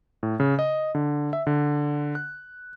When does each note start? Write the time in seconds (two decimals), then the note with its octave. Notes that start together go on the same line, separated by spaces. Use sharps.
0.23 A2
0.40 C#3
0.59 D#5
0.95 D3
1.33 E5
1.47 D3
2.15 F#6